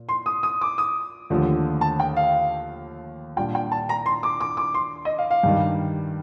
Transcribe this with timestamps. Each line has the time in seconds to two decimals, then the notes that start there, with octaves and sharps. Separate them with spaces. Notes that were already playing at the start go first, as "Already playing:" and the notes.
Already playing: A#2
0.09 C6
0.26 D#6
0.43 D#6
0.61 D6
0.78 D#6
1.30 D#2 D3 F3 A3
1.81 A5
2.00 G5
2.16 F5
3.36 A#2 G3 D4 F4 G5
3.55 G5
3.72 A5
3.89 A#5
4.06 C6
4.23 D6
4.40 D6
4.57 D6
4.74 C6
5.05 D#5
5.18 F5
5.31 F5
5.43 G2 D#3 G3